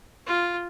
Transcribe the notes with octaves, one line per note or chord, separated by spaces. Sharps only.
F4